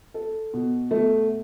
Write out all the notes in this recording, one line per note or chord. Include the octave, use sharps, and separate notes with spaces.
A4
B2
A3